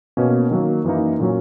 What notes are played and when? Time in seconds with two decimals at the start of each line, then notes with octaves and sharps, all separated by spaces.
0.17 B2 A#3 C#4
0.51 D#3 F#3 A#3
0.84 F#2 E3 A#3 D#4
1.20 A#2 F#3 C#4